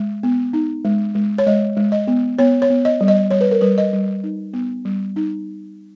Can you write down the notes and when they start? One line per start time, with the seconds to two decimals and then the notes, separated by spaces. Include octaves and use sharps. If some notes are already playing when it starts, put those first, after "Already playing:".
Already playing: G#3
0.23 B3
0.53 D#4
0.85 G#3
1.15 G#3
1.38 C#5
1.46 G#3 D#5
1.77 G#3
1.92 D#5
2.08 B3
2.39 B3 C#5
2.62 C#5
2.70 B3
2.85 D#5
3.01 G3
3.08 D#5
3.31 G3 C#5
3.41 B4
3.51 A#4
3.61 G3 B4
3.78 D#5
3.93 G3
4.24 D#4
4.53 B3
4.85 G3
5.16 D#4